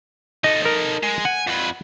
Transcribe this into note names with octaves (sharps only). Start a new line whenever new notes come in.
D#4 A4 D#5
A#4
G#3
F#5 G#5
F2 B4